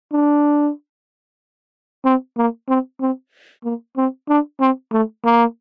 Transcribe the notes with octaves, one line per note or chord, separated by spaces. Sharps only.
D4
C4
A#3
C4
C4
A#3
C4
D4
C4
A3
A#3